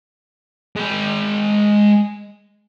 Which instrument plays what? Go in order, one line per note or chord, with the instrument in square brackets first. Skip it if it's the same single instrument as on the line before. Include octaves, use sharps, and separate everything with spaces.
[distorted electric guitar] G#3 G5